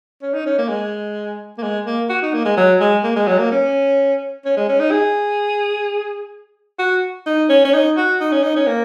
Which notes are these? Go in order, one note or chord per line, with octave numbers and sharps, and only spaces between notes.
C#4
D#4
C#4
A#3
G#3
A#3
G#3
A#3
F#4
D#4
A#3
G#3
F#3
G#3
A#3
G#3
F#3
A#3
C#4
C#4
G#3
C#4
D#4
G#4
F#4
D#4
C#4
C#4
D#4
F#4
D#4
C#4
D#4
C#4
A#3